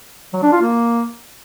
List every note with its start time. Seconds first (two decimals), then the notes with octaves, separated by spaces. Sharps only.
0.34 F#3
0.43 D4
0.52 F4
0.62 A#3